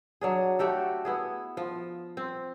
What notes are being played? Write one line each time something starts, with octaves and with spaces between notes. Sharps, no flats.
F#3 D4 G#4
A3 F#4 G4 A4
B3 E4 G#4
F3
C4